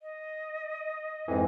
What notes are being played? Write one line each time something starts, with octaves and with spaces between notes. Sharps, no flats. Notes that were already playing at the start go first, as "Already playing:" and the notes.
D#5
F2 G#2 E3